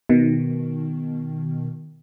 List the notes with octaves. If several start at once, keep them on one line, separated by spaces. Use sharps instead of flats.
B2 D#3